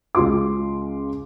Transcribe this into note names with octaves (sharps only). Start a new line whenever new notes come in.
C#2 C#3 F4 C6 D6